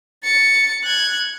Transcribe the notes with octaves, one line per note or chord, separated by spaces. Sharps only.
A6 C#7
F#6 G#6